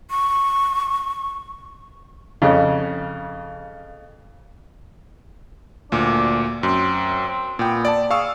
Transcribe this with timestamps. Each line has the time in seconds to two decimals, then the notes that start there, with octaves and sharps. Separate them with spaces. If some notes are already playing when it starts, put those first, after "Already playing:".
0.10 C#6
2.42 F2 C#3
5.92 D2 A#2 D4
6.63 F#2 C4
7.28 C4
7.59 A#2 B3 G5
7.85 D5 A5
8.11 G#4 F5 C#6 E6